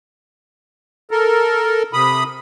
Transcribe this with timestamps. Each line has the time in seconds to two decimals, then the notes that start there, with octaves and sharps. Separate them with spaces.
1.11 A4 A#4
1.93 C3 B5 D#6